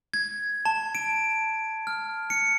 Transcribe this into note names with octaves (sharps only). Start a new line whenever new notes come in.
G#6
A5
D7
F6
C#7